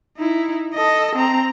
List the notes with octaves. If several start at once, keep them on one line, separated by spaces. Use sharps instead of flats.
D#4 E4
A4 D#5
C4 A#5